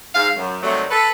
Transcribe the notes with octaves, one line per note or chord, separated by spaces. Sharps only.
G#2 F5
F#2
C3 D#3 F#3 G3 A3
A4 B4